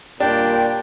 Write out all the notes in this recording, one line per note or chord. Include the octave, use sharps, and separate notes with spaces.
A#2 G3 D4 G5